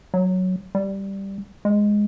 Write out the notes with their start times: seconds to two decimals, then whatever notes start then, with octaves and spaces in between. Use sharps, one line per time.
0.14 F#3
0.75 G3
1.65 G#3